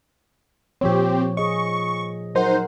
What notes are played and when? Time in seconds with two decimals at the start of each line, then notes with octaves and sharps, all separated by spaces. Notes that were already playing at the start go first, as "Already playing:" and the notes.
0.81 A#2 F3 C4 G4 C#5
1.37 G#4 D#5 C#6
2.35 F#3 D#4 A#4 C5 F#5